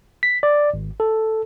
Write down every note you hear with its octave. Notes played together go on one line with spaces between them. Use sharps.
B6
D5
G#1
A4